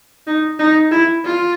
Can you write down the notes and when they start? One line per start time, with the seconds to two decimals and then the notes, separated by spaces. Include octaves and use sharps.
0.27 D#4
0.59 D#4
0.92 E4
1.25 F4